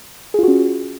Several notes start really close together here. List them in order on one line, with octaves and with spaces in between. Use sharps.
G#4 F4 F#4 C#4